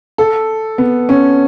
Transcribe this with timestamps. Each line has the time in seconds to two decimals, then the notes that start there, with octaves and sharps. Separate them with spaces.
0.18 A4
0.78 B3
1.09 C#4